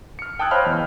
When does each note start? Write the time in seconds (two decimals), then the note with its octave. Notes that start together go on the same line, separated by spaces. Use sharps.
0.19 F6 C#7
0.39 G5 A5 D#6 E6 F#6 G#6
0.51 C5 C#5 D#5 F5 B5 F6
0.66 E2